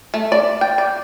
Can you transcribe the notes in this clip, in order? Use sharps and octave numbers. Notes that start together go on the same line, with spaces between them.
A3
D5
G5
D5